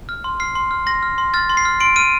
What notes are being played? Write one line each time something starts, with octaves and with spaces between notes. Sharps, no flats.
F6
C6
F6 C7
C6
F6
C6 A#6
F6
C6
F6 A6
C6
C7
F6
C6 D7
F6 D#7